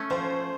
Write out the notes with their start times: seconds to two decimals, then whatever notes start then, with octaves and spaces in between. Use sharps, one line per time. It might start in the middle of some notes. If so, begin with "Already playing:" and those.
Already playing: A3 C#4
0.10 F3 C5